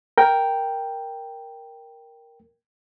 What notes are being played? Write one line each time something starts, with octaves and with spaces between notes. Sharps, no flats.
A#4 G5